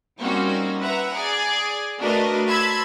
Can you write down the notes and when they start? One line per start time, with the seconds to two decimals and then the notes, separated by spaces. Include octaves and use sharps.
0.20 G3 A#3 C4 C#4 D#4 F#4
0.82 B4 E5 F#5 A#5
1.15 G#4 D5
2.00 A3 D4 F#4 A#4 B4 D#5
2.48 A5 B5 C6 E6 G#6